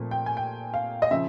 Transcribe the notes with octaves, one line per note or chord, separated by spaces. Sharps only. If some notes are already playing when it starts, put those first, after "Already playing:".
Already playing: A#2 F3 A3 C4
G5
G#5
G5
F5
D#5
C#3 F3 E5